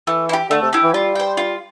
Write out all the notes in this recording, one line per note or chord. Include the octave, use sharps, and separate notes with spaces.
E3 A3
E4
G4
D3 A3
C3
E4 G4
E3
G3 F4
C5 G5
F4